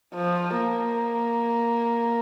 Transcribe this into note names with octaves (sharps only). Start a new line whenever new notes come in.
F3
A#3